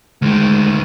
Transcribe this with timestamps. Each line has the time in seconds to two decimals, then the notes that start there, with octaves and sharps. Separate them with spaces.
0.22 D2 D#3 G#3